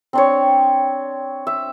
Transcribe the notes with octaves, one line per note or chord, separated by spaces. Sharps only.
C4 D4 C#5
E5